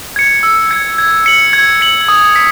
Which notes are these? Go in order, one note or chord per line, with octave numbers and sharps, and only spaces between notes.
G#6 C#7
E6
G#6 C#7
G#6
C#7 F#7
G#6
C#7 F#7
D#6
B6